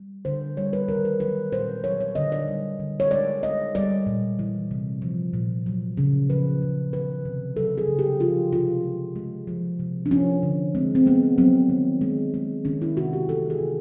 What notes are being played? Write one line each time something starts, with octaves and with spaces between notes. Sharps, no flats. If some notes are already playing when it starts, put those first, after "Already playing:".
Already playing: G3
D3 C5
G3 C#5
B4
D#3 A#4
B4
F#3 B4
A#2 C5
F#3 C#5
C#5
D3 D#5
D5
G3
D3
C#5
G#3 D5
G#3 D#5
G3 D5
A#2
E3
C3
F3
A#2
F#3
C#3
F3 B4
C#3
D#3 B4
C3
F#3 A4
G#4
C#3
G4
F3 F4
C3 F4
G#3
G#3
F3
C3
D4
F3 C#4
D3
G#3 C4
C4
G#3 B3
F#3 C4
D#3
G#3
G#3
D#3 C#4
E4
C3 F#4
G4
E3 A4
G#4
C3